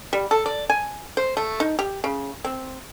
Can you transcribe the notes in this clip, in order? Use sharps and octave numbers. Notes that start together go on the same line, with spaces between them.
G3
A4
D5
G#5
C5
A3
D#4
G4
C#3
C4